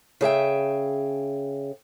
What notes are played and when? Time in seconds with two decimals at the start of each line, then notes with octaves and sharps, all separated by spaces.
0.21 C#3 G#4 E5 G5